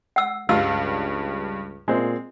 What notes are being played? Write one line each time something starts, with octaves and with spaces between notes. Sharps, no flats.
F#5 E6
C#2 G2 G3 F4 E6
A#2 G#3 C4